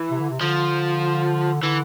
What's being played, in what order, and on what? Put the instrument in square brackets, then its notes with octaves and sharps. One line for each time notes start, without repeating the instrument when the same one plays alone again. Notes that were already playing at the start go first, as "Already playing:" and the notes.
Already playing: [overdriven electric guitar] E3
[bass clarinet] C3
D3
C3
[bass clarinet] D3 [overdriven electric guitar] F3
[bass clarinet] D3 [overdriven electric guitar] E3